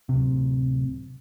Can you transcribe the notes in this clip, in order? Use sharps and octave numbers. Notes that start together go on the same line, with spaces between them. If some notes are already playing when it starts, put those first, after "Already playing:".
D1 C3